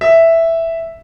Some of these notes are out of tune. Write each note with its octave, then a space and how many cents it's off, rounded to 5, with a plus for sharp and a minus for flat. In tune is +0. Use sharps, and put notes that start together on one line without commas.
E5 +0